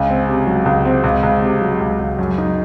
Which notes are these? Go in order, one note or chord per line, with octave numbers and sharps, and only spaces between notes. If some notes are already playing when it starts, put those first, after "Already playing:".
Already playing: C#2 C#4
C4
C3
F#3
C#2
C4
C#2
C#2
C3
F#3
C#2
C#2
F#2
D#4